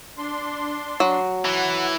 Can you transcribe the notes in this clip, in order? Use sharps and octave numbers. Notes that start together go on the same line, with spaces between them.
D4 C6
F#3
E3 F#5